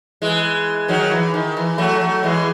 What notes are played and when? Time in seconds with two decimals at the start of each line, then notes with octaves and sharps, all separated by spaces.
0.22 E3 G#3
0.88 D#3 F#3
1.11 E3
1.34 D#3
1.57 E3
1.78 F#3 A3
2.01 F#3 A3
2.23 E3 G#3